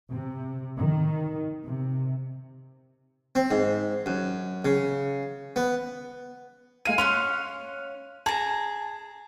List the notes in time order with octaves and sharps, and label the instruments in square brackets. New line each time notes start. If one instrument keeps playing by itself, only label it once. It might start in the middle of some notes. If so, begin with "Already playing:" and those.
[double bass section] C3
D#3
C3
[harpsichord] C4
G#2
F#2
C#3
B3
[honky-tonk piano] G#3 F5 D#7 [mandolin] G#5
[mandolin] C#4 F5 F#5 [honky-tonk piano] C6
[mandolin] G#4 A#5 [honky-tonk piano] A5